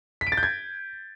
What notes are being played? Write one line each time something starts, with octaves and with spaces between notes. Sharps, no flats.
B6
D7
A6
G6
G#6